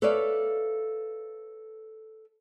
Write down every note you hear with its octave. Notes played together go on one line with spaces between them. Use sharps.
A4 B4 C#5 D5 E5 F5